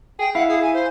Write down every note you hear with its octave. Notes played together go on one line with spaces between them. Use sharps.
G#4 G5
E4 F5 F#5
G#4
G#5
C5